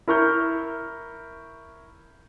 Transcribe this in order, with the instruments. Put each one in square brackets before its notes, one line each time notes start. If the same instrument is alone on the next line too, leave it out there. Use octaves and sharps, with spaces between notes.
[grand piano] E4 A#4 C#6 F6 G6